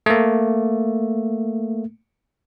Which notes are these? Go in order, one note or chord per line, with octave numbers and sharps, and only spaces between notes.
A3 A#3